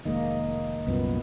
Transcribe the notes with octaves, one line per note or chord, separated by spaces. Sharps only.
F1 D#3 G#3 A#3 D#5
C2 F#2 A#2 B3